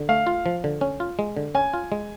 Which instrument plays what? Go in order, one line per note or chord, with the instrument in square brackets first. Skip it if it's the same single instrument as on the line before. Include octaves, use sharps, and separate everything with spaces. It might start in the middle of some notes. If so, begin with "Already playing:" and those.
Already playing: [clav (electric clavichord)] D3
[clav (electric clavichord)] A3 [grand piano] F5
[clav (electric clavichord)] F4
F3
D3
C#4
F4
G#3
D3
[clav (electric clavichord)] C#4 [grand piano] G#5
[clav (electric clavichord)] F4
G#3